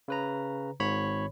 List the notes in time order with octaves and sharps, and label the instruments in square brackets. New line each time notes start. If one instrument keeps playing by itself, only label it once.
[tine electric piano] C#3 B4 A#5
G#1 G#2 C#5 B5